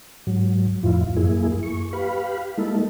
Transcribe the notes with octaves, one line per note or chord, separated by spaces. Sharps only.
G#2 F#3
F2 A2 F3 E4 F4
F#2 A#3 E4 G#4
C#6
G4 B4 F5 B5
G3 G#3 A#3 D#4 E4 A4